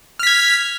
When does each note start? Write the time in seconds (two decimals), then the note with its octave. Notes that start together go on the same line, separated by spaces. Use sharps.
0.19 F6
0.23 B6
0.27 G#6